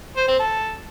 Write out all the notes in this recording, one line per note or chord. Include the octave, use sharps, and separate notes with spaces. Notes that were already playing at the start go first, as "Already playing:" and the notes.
C5
C4
A4